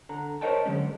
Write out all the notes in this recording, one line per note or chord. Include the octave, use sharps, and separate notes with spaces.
D3 A#5
A#4 C5 C#5 D#5 G5 A5
D3 F#3 G#3 C#4